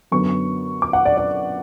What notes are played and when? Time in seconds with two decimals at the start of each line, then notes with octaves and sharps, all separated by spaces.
0.12 F#2 D3 F#3 B3 D4 C#6
0.82 D6
0.93 F#5
1.05 D5
1.17 D5